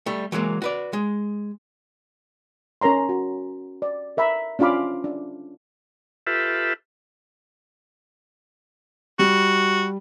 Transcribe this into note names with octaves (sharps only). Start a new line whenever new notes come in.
G3 A3
E3 F#3 G#3 A#3
F#4 B4 D5
G#3
C#4 A#4 C#5 A#5 C6
F#4
D5
A#4 E5 A#5 B5
C#4 D4 F4 F5 B5 D6
D4
F4 G4 A4 B4 E5
G3 F#4